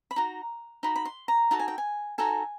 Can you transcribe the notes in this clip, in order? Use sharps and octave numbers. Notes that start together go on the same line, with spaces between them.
B5
D#4 F#4 A#5
D#4 F#4 B5
B5
C6
A#5
D#4 F#4 A4 A5
G#5
G5
G#5
D#4 F#4 A4 G#5